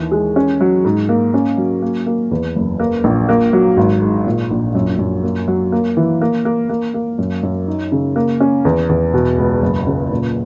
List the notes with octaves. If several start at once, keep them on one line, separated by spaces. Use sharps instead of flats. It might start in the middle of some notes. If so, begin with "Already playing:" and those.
Already playing: D#2 E3
G#3
C#4
F#3
G#2
A#3
C#4
F#3
A#3
A#3
E2
F#1
A#3
A#1
A#3
F#3
G#1
G#2
A#2
A#1
F#2
F#2
A#3
F#3
A#3
E3
A#3
A#3
A#3
A#3
F#2
F#2
D#4
C#3
A#3
C#4
E2
E2
B2
C#2
F#1
C#3
A#2